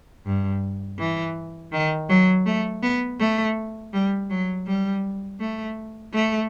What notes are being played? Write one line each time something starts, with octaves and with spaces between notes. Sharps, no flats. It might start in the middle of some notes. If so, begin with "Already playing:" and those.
G2
E3
D#3
F#3
A3
B3
A3
G3
F#3
G3
A3
A3